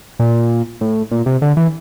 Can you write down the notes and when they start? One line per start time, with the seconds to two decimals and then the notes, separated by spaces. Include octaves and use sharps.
0.19 A#2
0.81 A2
1.11 A#2
1.26 C3
1.42 D3
1.57 E3